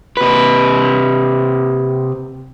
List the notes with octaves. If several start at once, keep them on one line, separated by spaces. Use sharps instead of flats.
C3 B4